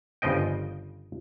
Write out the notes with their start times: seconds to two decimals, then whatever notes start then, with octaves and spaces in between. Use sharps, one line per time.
0.22 G1 C#3 F3 D#5 G5